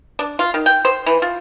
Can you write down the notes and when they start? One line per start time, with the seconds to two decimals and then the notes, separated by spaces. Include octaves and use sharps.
0.19 D4
0.39 F4
0.54 D#3
0.66 G5
0.85 C5
1.06 E3
1.22 F4